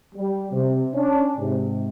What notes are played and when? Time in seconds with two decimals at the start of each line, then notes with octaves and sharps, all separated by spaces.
0.15 G3
0.52 C3
0.94 C#4 D4
1.37 G#2 C3